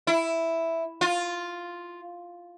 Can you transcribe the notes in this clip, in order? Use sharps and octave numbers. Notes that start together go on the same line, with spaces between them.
E4
F4